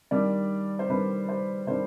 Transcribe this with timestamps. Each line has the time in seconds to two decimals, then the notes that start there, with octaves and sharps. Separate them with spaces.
0.11 D#3 G3 D4 D5
0.79 C5
0.90 D#3 G3 D4 B4
1.29 C5
1.67 D#3 G3 D4 C5